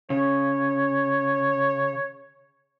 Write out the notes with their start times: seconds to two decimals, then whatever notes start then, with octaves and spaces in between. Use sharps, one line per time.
0.10 C#3 C#5